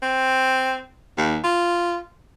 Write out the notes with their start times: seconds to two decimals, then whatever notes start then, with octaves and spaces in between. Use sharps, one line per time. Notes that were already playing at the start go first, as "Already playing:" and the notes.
0.02 C4
1.18 D#2
1.44 F4